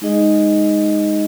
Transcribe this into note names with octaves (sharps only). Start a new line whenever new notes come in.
G#3 D#4 G#4 D#5